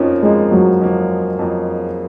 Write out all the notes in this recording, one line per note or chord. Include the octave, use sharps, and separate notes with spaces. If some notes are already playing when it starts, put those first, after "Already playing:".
Already playing: F2 F3 A#3 C#4 D#4
F2 F3 G#3 A#3
F#3
F2 F3 A#3
F2 F3 A#3